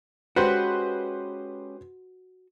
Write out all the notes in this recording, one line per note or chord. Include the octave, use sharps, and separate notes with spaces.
G#3 C#4 F#4 G4 B4 C5